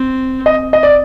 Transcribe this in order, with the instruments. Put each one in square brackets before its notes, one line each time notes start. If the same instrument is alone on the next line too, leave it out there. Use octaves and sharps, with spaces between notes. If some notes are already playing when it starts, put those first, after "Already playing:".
Already playing: [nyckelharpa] C4
[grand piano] D#5
D#5
D5